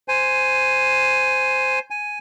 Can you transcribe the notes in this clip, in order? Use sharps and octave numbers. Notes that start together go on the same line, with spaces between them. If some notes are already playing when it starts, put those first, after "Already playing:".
C5 G#5
G#5